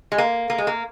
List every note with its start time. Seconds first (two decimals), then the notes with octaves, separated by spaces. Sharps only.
0.12 G#3
0.18 A#3
0.50 A#3
0.58 G#3
0.67 A#3